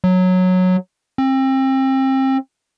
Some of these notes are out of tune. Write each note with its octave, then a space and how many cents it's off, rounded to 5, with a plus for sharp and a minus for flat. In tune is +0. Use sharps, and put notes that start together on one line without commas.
F#3 -10
C4 +30